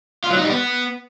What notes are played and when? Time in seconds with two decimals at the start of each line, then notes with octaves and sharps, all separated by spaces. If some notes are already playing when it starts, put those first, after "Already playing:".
0.24 F4
0.30 F#3
0.37 D#4
0.43 G3
0.49 B3